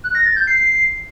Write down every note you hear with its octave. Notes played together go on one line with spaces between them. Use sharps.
F#6
A#6
A6
G6
C7